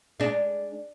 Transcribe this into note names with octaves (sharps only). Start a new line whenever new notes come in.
G#3 D4